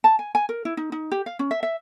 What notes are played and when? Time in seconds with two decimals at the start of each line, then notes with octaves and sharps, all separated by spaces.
0.04 A5
0.19 G#5
0.35 G#5
0.49 A#4
0.65 E4
0.77 D#4
0.92 D#4
1.12 G4
1.26 F5
1.39 C#4
1.51 E5
1.63 E5